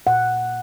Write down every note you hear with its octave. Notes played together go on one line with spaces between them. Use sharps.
A#2 F#5